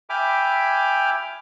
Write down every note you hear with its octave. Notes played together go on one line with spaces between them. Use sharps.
E5 G5 G#5 B5 D6 F6